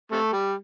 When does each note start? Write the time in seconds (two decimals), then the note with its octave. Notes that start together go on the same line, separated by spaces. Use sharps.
0.12 C3 A3
0.33 G3